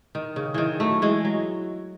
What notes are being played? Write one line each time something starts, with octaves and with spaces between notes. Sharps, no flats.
D#3
C#3
D#3 E3
F#3 A3
E3 G#3
F#3